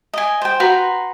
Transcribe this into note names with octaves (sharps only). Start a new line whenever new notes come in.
D#5 G#5
C5 G5
F#4 B4 A#5 C6